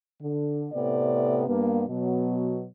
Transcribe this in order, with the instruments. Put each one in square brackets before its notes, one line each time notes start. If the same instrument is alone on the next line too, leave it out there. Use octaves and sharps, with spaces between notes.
[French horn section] D3
A2 C3 A3 B3 C4 D5
G2 A#3 B3
B2 F#3 B3